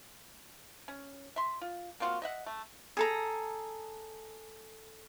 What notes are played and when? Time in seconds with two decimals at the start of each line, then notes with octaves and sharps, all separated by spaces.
0.88 C#4
1.36 E5 C6
1.61 F4
2.00 A#3 C4 F4 F#4
2.22 D#5 E5 F#5
2.46 A3
2.97 G#4 A4 A#5